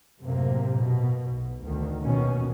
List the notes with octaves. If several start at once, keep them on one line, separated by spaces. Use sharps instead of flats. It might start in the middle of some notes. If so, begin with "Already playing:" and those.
F#2 A2 C3 A#3
B2
B1
D2 D#3
A#1 D#2 B2 D#3 C#4